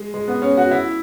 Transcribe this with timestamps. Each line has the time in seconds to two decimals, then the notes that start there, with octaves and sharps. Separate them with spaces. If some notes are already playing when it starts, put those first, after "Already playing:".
Already playing: G#3
0.14 G#3
0.28 B3
0.42 C#4
0.57 F#4
0.71 E4